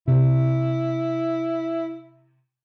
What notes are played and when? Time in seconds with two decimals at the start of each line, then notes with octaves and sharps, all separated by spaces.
0.08 C3 E4